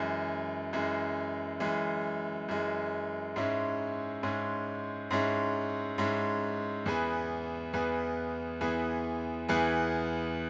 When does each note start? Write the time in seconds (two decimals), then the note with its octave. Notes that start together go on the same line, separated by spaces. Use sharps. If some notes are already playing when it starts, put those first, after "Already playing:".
Already playing: F#2 E3 G#3
0.73 F#2 E3 G#3
1.60 F#2 E3 G#3
2.48 F#2 E3 G#3
3.36 G#2 G#3 C#4 E4
4.23 G#2 G#3 C#4 E4
5.11 G#2 G#3 C#4 E4
5.98 G#2 G#3 C#4 E4
6.86 E2 E3 B3 G#4 B4
7.73 E2 E3 B3 G#4 B4
8.61 E2 E3 B3 G#4 B4
9.49 E2 E3 B3 G#4 B4